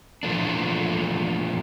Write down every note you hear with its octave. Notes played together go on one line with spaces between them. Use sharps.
A#2 E3 F3 A3 D4